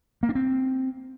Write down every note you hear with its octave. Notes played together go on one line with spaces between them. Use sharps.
A#3
D4
C4